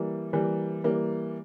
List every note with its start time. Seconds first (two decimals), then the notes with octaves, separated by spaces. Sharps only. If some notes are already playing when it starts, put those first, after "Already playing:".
Already playing: E3 G3 A#3
0.33 E3 G3 A#3
0.84 E3 G3 A#3